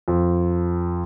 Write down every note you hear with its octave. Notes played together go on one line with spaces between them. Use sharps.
F2